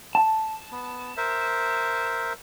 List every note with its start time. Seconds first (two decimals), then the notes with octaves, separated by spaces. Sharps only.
0.15 A5
0.72 B3
1.17 A#4 C5 E5